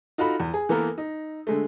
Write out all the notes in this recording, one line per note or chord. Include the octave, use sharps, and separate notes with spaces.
D#4 F4 F#4 A4 B5
E2
G#4
E3 A#3 B3 A4 A#4
D#4
D3 G#3 A3